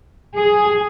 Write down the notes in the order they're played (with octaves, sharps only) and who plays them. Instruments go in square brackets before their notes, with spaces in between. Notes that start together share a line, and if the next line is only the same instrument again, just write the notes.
[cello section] G#4